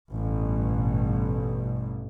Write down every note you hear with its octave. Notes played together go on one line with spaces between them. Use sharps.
A1 G2 B2